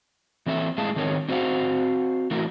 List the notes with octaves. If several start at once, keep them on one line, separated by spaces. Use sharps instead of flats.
E3 C4 A4 E5
A2 G#3 G#4 F5 A5
D#3 C4 D#4 A#4 C#5
C4 F#4 C5 F5 F#5
E3 A3 E4 F#4 A#4